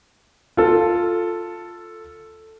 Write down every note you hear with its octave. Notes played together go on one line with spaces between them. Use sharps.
F4 A4